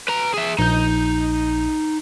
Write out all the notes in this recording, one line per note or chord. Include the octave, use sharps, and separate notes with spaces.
B4 A#5
G#4 E5
A#1 D#4 G6